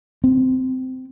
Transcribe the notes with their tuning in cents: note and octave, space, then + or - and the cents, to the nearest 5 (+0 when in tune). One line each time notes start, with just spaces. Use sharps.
C4 -20